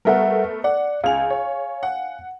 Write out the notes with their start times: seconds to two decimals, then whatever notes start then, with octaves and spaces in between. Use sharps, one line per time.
0.05 G3 A3 B3 A#4 E5 F#5
0.64 D5 F#5
1.04 C#2 F5 G#5 F7
1.30 C#5
1.83 F#5